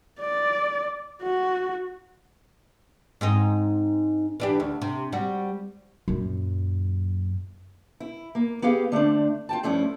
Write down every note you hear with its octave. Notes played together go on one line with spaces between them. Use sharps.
D5
F#4
G#2 C4 D#4
E3 D4 G4
D2
C3
G3 C4 F#4
F#2 A#2
E4
A#3
B3 G4 G#4 F5
D3 A3 C4 D4
F4 G5 A5
G2 F3 A3 C#4 E4